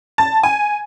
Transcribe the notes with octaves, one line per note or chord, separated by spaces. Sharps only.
A5
G#5